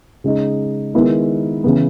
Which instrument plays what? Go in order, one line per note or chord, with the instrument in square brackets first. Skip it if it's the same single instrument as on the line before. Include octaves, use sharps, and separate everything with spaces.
[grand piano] C#3 G#3 D#4
D#3 G#3 B3 E4 A#4
C#3 E3 B3